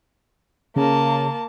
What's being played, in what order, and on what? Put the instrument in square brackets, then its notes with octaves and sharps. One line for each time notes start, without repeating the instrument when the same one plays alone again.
[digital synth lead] C#3 [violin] A#3 A5